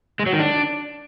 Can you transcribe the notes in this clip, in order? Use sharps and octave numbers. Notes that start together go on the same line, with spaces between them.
G#3
F#3
D#3
D4